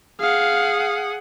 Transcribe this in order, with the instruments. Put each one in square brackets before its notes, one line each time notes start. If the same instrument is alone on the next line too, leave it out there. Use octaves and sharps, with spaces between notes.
[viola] G#4 F#5 [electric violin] F5